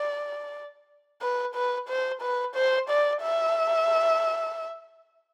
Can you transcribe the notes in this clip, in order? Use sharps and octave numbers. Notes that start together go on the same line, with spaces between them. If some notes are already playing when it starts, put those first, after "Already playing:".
Already playing: D5
B4
B4
C5
B4
C5
D5
E5